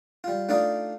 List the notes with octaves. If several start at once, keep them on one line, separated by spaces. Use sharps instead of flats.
G3 F4
A3 D4 D#4 F4 D5 D#5